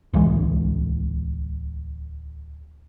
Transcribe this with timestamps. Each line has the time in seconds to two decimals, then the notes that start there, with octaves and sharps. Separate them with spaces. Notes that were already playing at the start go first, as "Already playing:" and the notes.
0.13 D1 C2 E3 G#3